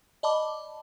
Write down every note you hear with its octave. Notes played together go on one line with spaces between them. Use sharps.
D5 D#5 A5 B5 D6